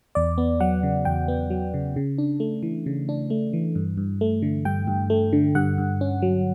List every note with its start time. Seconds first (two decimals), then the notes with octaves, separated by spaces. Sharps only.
0.15 E2 D5
0.38 B3
0.60 F#3 F#5
0.83 C#3
1.05 E2 G5
1.28 B3
1.50 F#3
1.74 C#3
1.96 C#3
2.18 D4
2.40 A3
2.63 E3
2.86 C#3
3.09 D4
3.30 A3
3.53 E3
3.76 G2
3.97 G2
4.21 A3
4.42 D3
4.65 G2 G5
4.87 G2
5.10 A3
5.33 D3
5.55 G2 F#5
5.78 G2
6.01 C#4
6.22 F#3